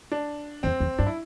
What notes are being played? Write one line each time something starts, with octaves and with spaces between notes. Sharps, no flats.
D4
E2 C4
E2
G2 D4
E4